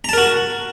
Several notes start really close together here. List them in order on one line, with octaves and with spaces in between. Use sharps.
A#5 A5 A#4 F#4